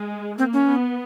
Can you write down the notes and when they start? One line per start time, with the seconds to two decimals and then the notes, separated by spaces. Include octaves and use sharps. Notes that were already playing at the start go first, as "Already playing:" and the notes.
Already playing: G#3
0.38 A#3 C4
0.53 C#4
0.67 B3